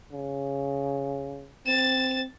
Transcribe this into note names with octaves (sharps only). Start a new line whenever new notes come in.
C#3
C4 A6 E7